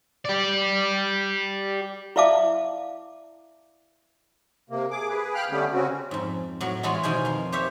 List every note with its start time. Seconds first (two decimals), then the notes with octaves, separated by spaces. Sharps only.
0.25 G4 D5
2.16 E4 D5 E5 F5 A5 D6
4.70 C3 A#3
4.91 G#4 D6
5.08 G#4 B4
5.35 F5 G5 B5 F6 F#6
5.50 D3 G3 A3 B3 C#4 G4
5.72 C#3 C4 C#4 F#4
6.11 F2 G#2
6.61 A2 F#3
6.83 E3 G#3 B3 C#4 F4
7.03 B2 D#3 A#4 C5 G#5
7.25 F2 F5 C6
7.52 G4 C5 C#5 E5